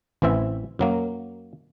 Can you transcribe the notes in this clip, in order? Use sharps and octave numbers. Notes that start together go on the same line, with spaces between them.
A1 E3 C4 E5
F#2 F#3 A#3